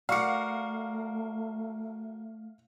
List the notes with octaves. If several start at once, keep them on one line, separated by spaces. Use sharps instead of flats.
A3 F#4 A#4 D5 F5 C#6 D6 C#7